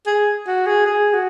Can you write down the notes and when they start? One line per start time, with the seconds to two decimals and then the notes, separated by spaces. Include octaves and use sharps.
0.07 G#4
0.47 F#4
0.67 G#4
0.87 G#4
1.14 F#4